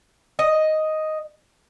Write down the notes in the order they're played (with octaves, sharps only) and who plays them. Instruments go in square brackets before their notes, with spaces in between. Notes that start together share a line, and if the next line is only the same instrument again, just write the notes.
[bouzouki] D#5